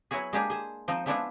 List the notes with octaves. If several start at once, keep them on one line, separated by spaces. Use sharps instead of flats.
F#3 B3 E4 F#4 G#4
G#3 A#3 D4 G4 G#4
G#4 C5
F3 C4 D#4
F3 G#3 B3 D4 E4 F4